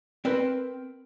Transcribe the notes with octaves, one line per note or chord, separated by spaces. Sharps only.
C4 A#4 B4 C6